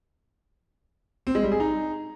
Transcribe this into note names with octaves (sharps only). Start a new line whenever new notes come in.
C4
G#3
G3
G#4
D#4